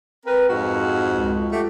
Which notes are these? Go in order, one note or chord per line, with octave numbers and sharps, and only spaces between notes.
C4 A#4 B4
F2 G#2 F#4
C#2
A3 F#4 G4